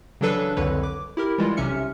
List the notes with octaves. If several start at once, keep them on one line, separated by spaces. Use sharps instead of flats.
C#3 E3 F#3 D4 A4 B4
C2 F2 D3 B4 C#5 B5
D6
E4 G4 A#4
E3 G3 G#3 E4 F4
B1 C3 C#4 E5 F6 C#7